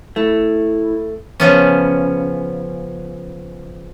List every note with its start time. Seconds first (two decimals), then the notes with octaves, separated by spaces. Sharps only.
0.16 A3 E4
1.40 C#3 F3 B3 C#4